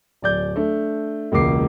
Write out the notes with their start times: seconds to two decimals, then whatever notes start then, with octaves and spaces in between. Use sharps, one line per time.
0.22 D1 D5 G6
0.56 A3 D4
1.32 E1 C#2 A#3 D6 C7